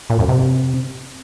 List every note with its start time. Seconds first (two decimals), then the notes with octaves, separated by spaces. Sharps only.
0.10 A#2
0.19 F#2
0.29 C3